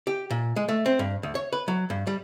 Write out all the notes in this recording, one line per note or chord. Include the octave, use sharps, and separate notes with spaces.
G4
A#2
G#3
A3
C4
G2
D2
C#5
B4
F#3
G2
G3